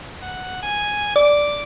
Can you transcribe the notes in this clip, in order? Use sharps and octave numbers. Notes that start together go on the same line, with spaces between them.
F#5
G#5
D5 D6